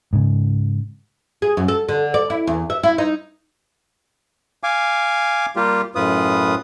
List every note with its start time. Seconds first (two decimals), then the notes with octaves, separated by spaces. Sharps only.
0.13 G#2 C#3
1.42 G#4
1.57 F#2
1.68 A4
1.89 D3
2.14 D5
2.30 E4
2.47 E2
2.70 E5
2.83 E4
2.98 D#4
4.63 F5 G#5 D6
5.56 G3 A#3 F4 G4
5.95 F#2 A2 F4 B4 D#6